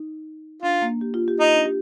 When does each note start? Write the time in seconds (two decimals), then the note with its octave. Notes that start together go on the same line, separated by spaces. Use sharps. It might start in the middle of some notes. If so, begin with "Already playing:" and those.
Already playing: D#4
0.62 D4 F4
0.82 A#3
1.01 G4
1.14 F4
1.28 G4
1.40 D#4 F4
1.53 D4
1.66 G4